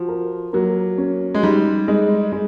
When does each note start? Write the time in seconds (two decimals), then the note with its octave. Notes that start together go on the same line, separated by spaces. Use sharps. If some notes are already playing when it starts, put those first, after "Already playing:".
Already playing: F3 F#4
0.08 A#4
0.53 F#3 A#3
0.98 C#4
1.34 G#3
1.43 G3 D#4
1.88 G#3
2.32 G#3